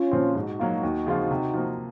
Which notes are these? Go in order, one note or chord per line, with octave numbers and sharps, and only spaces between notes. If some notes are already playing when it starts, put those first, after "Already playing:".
Already playing: C#4 F4
A#2 F3 C4
G#2 D#4 F#4
F#3 A#3 F4
D#2
C#3 F3 C4 F4
C3
F3 A#3